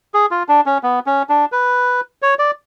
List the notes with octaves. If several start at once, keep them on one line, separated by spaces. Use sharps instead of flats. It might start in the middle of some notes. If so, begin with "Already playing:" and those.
G#4
F4
D4
C#4
B3
C#4
D4
B4
C#5
D5